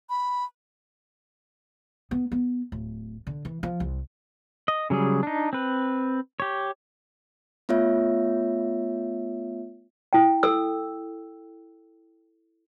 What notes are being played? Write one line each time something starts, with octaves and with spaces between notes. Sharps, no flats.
B5
B3
B3
D1
D3
E3
F3
C2
D#5
C#3 F#3 G3 G#4
D4 D#4
C4 B4
G4 C#5
A3 B3 F4 C#5 E5
E4 G5
A4 E6